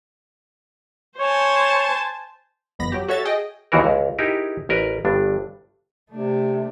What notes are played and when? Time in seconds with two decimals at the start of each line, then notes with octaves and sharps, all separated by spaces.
1.19 C5 C#5 G#5 A5
2.79 G1 F2 B3 B5 A#6
2.92 F#3 G4
3.08 F#4 A4 C#5 E5 A6
3.25 G#4 D#5 G5
3.72 D#2 D#3 E3 F#4 A#4
3.84 C#2
4.19 D#4 E4 G4 G#4 A#4
4.69 A1 A#4 B4
5.05 G1 G2 D4
6.11 C3 A3 D4